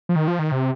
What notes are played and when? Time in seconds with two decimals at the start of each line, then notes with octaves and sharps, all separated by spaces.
0.09 F3
0.16 D#3
0.28 F3
0.39 D#3
0.52 C3